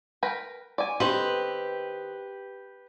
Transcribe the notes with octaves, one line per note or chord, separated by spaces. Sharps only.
A#4 B4 G5
D5 G#5
D#3 C4 G4 B4